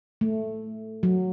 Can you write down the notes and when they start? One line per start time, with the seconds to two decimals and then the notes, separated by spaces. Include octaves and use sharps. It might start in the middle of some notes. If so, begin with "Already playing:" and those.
0.21 A3
1.03 F#3